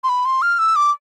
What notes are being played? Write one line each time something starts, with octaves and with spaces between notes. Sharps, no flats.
C6
B5
C6
F6
E6
D6